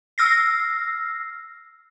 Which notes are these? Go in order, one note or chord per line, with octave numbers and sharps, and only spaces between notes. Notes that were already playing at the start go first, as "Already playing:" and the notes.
E6 F6 A#6 C7